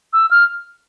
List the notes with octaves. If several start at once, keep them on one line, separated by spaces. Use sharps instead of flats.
E6
F6